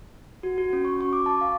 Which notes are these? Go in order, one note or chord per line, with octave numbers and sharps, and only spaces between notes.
F#4
F#4
C#4
C#6
C#6
D6
A5
F5